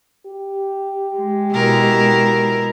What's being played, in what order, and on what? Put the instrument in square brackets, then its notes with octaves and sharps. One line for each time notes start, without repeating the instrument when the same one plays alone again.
[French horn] G4
[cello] G#3
[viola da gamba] B2 E4 A#4